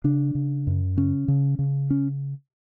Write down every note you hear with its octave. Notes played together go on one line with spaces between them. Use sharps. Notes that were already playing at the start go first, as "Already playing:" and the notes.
C#3 D4
C#3
F#2
C#3 C#4
C#3
C#3
C#4